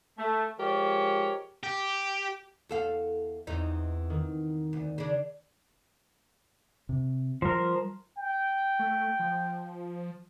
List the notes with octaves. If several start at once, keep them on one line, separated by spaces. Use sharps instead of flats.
A3
F3 G#3 G4 A#4 C#5
G4
E2 A4 F5
E2 C4 D#4
D#3
D2
C#3 D4
C3
F3 G3 A#4
G5
A3
F3